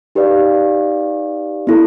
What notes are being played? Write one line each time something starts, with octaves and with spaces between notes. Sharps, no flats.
D#4 G4 B4 D5 F5
B3 E4 A4